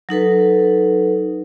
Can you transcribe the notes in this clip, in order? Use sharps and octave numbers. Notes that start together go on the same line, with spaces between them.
F#3 D#4 A4 B4